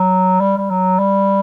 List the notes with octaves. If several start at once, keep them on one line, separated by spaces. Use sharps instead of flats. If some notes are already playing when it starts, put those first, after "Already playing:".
Already playing: F#3
G3
G3
F#3
G3